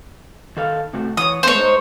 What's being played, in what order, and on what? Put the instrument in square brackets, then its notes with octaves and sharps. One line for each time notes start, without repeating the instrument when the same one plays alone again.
[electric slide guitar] D#3 A4 F5
C3 A3 F#4
[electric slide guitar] E3 C#5 [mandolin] D#6
[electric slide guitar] A3 B3 [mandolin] C5 C#5
[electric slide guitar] G#3 D#4